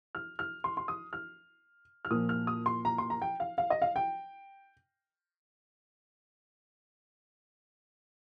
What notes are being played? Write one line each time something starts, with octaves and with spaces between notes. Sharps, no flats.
F6
F6
C6
C6
D#6
F6
F6
A#2 F3 A#3 D#6
F6
D#6
C6
A#5
C6
A#5
G5
F5
F5
D#5
F5
G5